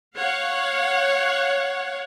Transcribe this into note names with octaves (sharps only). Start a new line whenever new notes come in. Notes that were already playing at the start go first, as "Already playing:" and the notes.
C#5 F5 F#5